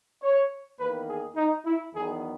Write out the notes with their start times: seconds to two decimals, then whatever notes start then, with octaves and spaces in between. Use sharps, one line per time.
0.23 C#5
0.79 E2 D#3 A#3 B4
1.08 G#4
1.36 D#4
1.65 E4
1.93 E2 D#3 F#3 B3 G#4